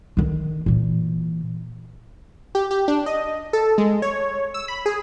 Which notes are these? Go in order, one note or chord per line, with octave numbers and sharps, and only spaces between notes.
D3 D#3
A#2 E3
G4
G4
D4
D#5
A4
G#3
C#5
E6
B5
G#4